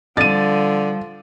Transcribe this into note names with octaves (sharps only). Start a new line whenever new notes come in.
D3 F3 G3 A6 D#7